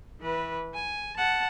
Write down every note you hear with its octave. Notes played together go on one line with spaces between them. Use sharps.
E3 B4
G#5
F#5 A5